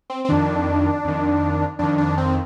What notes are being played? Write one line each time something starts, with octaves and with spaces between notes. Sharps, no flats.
C4
C4
F2 D#3 D4
F2 D#3
F2 D#3 D4
D4
C4